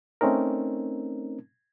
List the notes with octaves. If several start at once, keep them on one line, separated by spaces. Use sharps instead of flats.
A3 C4 C#4 D#4 A#4